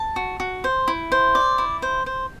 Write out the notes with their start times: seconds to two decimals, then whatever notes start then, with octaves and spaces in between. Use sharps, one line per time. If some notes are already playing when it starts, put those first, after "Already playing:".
Already playing: A5
0.16 F#4
0.40 F#4
0.64 C5
0.88 E4
1.12 C5
1.35 D5
1.58 E4
1.82 C5
2.06 C5